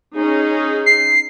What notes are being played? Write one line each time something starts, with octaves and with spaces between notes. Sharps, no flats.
C#4 D#4 G#4
C7